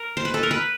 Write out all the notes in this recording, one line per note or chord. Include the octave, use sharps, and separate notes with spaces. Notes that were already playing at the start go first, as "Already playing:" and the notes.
Already playing: A#4
C5
B4
A4
A#4
B4